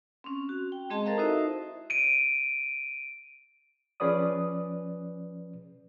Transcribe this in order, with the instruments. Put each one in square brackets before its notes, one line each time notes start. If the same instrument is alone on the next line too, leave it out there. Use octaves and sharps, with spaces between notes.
[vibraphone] C4 C#4
F#4
G5
G#3 C4 G#4 D#5 A5 C6
A4 A#4 C5 D#5 F5 A#5
D#4 E4 F#4 C5 D#5 E5
[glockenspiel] D7 D#7
[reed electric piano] F3 C#4 G#4 B4 D5 D#6